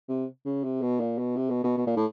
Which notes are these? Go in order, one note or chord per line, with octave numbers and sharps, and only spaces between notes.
C3
C#3
C3
B2
A#2
B2
C3
B2
B2
B2
A#2
A2